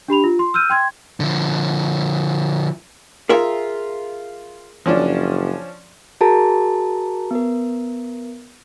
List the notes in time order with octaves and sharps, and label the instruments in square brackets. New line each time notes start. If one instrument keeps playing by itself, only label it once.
[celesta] D4 G4 B5 F7
F4
C6
E6 F6 G6 D#7
G5 C6 G#6
[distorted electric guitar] D3 F3
[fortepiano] F4 [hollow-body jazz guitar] G#4 A#4 E5
[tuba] F#1 [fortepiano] F3 C#4 D4
[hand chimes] F#4 G#4 A#4 A5 A#5
B3 A#4